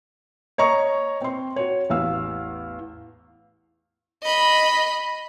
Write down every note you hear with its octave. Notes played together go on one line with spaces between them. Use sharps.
C#5 D#5 A#5 C#6
C4 C6
F#4 C#5
A1 E2 F5 E6
D#5 B5